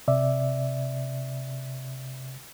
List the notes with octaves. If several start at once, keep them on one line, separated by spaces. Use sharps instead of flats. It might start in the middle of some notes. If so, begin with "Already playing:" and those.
C3 D5 E5